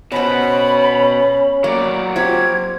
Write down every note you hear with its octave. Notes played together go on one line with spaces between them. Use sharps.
B2 B3 C#4 B4 C5 B5
F#3 A#3 D5
C4 F4 G4 G#6